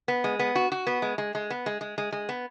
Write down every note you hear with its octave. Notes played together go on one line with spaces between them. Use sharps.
B3
G#3
B3
F#4
F#4
B3
G#3
G#3
G#3
B3
G#3
G#3
G#3
G#3
B3